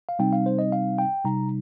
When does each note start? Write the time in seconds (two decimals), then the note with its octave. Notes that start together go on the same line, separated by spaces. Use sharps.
0.09 F5
0.19 C3 G3 C4 D#4 G5
0.33 F5
0.46 C5
0.59 D#5
0.72 F5
0.98 G5
1.25 C3 G3 D#4 A#5